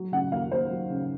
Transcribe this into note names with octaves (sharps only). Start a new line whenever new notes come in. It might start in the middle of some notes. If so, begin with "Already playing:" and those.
Already playing: F#3
C#3 F#5
D#2 F5
D#2 C5
F#3
C#3